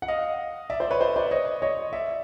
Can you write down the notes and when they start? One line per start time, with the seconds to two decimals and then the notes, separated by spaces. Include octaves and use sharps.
0.02 F#5
0.08 D#5 F5
0.70 D5 E5
0.80 C5 D5
0.90 B4 C#5
1.00 C5 D5
1.16 C5 D5
1.31 C#5 D#5
1.62 C#5 D#5
1.93 D5 E5